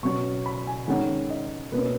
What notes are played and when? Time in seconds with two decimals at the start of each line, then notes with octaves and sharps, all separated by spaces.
0.03 B2 F#3 C#4 C#6
0.46 B5
0.67 G#5
0.88 D#3 G#3 C#4 F#5
1.30 D#5
1.72 B2 A#3 C#4 B4